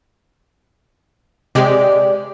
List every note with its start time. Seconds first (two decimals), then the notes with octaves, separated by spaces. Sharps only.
1.55 C3 G#3 G4 D5